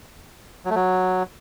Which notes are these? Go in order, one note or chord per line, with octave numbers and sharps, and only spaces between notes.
F#3
A3
F#3